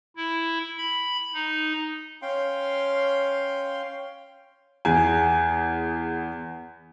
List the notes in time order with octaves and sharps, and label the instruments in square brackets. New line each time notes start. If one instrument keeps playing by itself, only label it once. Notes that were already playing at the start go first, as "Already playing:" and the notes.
[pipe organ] E4
B5
D#4
[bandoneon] C#4 F5 G5 C6
[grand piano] E2 G#4 G#5